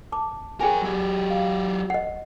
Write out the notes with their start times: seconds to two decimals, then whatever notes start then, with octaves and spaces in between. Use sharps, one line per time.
0.12 A5 D6
0.61 G#4 A#4 C#5 G5 G#5
0.82 F#3 G4
1.30 F5
1.90 D#5 F#5